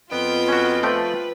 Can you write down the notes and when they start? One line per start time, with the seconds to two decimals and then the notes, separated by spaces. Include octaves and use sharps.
0.11 F2 B3 F4 D#5 G5 G6
0.48 C#4 F#4
0.83 F3 A3 B4 G5